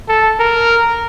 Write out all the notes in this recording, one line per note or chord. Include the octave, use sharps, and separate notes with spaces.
A4
A#4